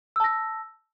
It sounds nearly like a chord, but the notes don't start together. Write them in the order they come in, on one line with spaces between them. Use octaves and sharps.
E6 A5 A#6